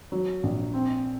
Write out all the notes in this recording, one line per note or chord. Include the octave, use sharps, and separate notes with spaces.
F#3
A#1
C4